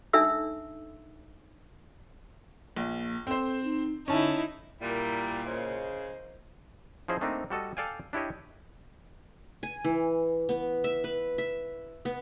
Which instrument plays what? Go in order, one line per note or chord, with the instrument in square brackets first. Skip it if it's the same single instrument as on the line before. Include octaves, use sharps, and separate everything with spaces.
[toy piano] D4 D#4 A4 E5 E6
[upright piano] A#1 [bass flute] A#3
[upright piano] C4 C5 [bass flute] A4
[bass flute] D#4
[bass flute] D3 [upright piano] C#4 A5 [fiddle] D#4 E4
[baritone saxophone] A#2 [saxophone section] G3 [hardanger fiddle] E4 A#4
[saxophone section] C#3 [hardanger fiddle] C5 D#5
[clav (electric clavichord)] F3 C#4 E4 G#4 C5 D#5
A3 A#3 C4 D4 D#4
G3 F#4 A4 D#5
A4 D5 F5 G5 G#5
D4 E4 G4 C#5 D#5
[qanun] G#5
E3
B3
E5
B4
E5
B3